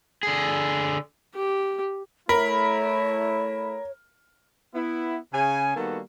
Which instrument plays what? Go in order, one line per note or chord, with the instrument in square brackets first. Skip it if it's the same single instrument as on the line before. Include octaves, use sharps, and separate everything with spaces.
[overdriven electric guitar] D3 G#4
[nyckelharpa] G4
[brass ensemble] A3 E4 [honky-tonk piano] A#4 [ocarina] C#5 [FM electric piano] B5
[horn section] B3 E4
C#3 G#5
D#3 G3 A#3 B3 F#4 A4